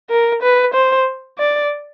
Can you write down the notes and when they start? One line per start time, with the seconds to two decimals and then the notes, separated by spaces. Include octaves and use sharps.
0.10 A#4
0.42 B4
0.74 C5
1.38 D5